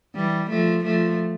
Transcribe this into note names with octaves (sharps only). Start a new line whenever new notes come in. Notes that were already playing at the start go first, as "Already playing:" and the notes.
E3 G3
F3 A3
F3 A3